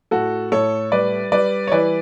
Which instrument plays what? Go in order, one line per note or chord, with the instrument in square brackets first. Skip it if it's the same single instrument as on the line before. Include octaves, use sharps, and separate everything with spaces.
[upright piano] A2 F#4 A4
A2 A4 C#5
G3 B4 D5
G3 B4 D5
C#5
E3 B4 D5